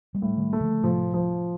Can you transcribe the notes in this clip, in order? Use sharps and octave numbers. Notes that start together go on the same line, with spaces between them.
G3 A#3
A2
D#3 G3
A3
D3 F3
A2 C3 F3
F3